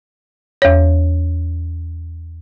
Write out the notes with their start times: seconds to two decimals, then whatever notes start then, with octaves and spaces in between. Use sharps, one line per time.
0.62 E2 C#5